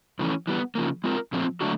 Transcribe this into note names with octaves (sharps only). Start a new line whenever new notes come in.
F2 C#3 E3 A3 C#4
E3 G3 B3
C#3 F3 A#3
G#3 C4 F4 A#4
A#2 F3 A3 C4
D3 F#3 A3 D4 F#4